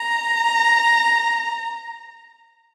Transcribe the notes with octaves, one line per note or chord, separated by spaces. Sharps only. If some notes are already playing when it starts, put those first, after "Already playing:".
Already playing: A#5